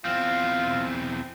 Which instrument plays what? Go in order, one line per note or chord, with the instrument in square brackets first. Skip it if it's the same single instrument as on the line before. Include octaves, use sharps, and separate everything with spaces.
[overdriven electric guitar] E2 C4 [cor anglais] F4